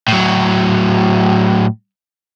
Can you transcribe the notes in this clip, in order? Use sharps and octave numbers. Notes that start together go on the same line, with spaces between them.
A2 F#3